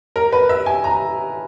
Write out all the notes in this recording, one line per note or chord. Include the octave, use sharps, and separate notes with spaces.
A#4
B4
E5
G#5
A#5